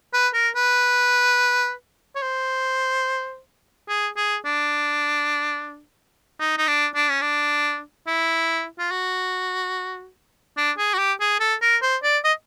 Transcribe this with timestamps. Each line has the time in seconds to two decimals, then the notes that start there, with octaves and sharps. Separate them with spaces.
0.14 B4
0.34 A#4
0.56 B4
2.15 C#5
2.22 C5
3.89 G#4
4.17 G#4
4.45 D4
6.39 D#4
6.58 D#4
6.68 D4
6.95 D4
7.09 C#4
7.21 D4
8.07 E4
8.79 F4
8.91 F#4
10.57 D4
10.78 G#4
10.94 F#4
10.98 G4
11.20 G#4
11.40 A4
11.62 A#4
11.82 C5
12.03 D5
12.24 D#5